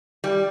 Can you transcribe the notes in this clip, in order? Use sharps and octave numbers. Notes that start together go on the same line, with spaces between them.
G3